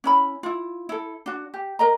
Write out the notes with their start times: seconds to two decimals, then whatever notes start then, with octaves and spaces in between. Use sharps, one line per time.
0.04 C#4 E4 B5
0.43 E4 F4
0.89 E4 A4
1.26 D4 F#4
1.54 G4
1.79 A#4 D#5 A#5